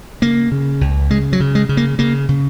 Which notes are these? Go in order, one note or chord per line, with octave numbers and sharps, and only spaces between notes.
C#3 A#3
C#3
C#2
C#3 G#3
F#3
C#3
G#3
C#3
A#3
C#3 A#3
C#3